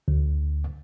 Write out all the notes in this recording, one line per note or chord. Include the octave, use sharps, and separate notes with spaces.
D2